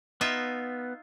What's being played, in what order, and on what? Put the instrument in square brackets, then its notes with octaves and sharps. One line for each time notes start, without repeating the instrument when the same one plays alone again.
[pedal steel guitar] B3 [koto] D#4 F4 E5